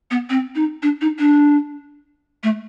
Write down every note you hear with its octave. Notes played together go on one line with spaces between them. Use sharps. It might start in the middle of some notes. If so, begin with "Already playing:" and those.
B3
C4
D#4
D4
D#4
D4
A3